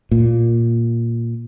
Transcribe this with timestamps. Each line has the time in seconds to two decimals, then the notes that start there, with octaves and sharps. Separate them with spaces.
0.11 A#2